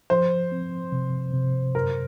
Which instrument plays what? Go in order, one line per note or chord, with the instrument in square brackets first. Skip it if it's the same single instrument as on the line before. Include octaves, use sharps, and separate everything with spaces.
[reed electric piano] F3 [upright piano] C5
[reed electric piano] C4
C3
C3
[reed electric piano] F#2 [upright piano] A#4